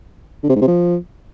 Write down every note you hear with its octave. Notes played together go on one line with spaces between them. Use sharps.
D3
C3
G#2
C3
F3